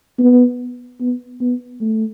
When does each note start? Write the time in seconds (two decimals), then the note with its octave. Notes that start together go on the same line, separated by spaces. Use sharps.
0.19 B3
1.00 B3
1.41 B3
1.80 A3